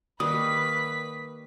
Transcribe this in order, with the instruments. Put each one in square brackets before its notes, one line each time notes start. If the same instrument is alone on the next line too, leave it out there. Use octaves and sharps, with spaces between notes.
[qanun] D#3 G3 A#3 [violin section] B4 B6 [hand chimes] D#6